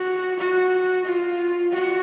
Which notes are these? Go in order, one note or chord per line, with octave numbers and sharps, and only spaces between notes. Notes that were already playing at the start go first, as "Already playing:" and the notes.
Already playing: F#4
F#4
F4
F#4